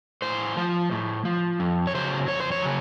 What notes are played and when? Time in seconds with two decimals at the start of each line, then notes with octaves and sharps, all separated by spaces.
0.22 A2 C5
0.57 F3
0.91 A2
1.25 F3
1.60 F2
1.87 C#5
1.95 C#3 F#3 C5
2.28 F2 C#5
2.40 C5
2.52 C#5
2.63 C#3 F#3